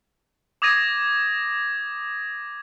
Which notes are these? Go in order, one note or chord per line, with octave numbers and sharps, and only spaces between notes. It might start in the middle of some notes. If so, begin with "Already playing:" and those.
D6 D#6 G#6 A#6 D#7